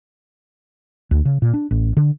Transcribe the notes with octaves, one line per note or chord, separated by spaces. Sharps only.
D2
C#3
A#2
D4
A1
D3